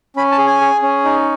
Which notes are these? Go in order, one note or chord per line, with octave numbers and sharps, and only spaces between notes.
C#4 B5
A5
G#4
G#5
G#4
C#4
D#4